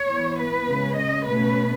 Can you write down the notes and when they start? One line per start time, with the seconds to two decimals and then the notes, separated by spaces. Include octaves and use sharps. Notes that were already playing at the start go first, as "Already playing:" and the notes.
Already playing: C#5
0.09 E3 B3
0.39 B4
0.68 C#3 G#3 C#4
0.96 D#5
1.25 B2 A3 C#4 B4